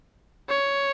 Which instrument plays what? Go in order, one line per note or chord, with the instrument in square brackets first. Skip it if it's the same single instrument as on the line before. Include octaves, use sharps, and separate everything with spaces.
[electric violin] C#5